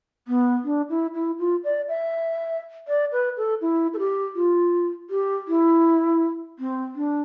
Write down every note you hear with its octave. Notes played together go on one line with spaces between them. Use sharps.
B3
D4
E4
E4
F4
D5
E5
D5
B4
A4
E4
A4
G4
F4
G4
E4
C4
D4